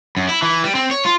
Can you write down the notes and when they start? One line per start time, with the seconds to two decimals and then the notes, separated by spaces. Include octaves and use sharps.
0.17 F#2
0.29 E4
0.42 E3
0.64 G3
0.75 C4
0.91 C#5
1.05 F4